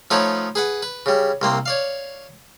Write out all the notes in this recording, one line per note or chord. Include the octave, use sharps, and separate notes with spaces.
F3 A3 B3 D#4 B4 C#5
G#4 B4 F#5
B4
C#3 G3
C2 A#3 C4
C#5 D5 F5